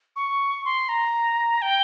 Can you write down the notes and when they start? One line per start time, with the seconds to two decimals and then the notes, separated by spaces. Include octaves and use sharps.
0.16 C#6
0.65 C6
0.89 A#5
1.62 G5